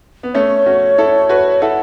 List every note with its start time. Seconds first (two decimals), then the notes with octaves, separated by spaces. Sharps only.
0.23 B3
0.34 A3 C#4 C#5
0.66 C#4 F#4
0.98 E4 A4
1.29 F#4 B4
1.62 E4 A4 F#5